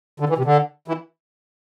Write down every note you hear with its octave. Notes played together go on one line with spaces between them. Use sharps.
D3
E3
C3
D3
E3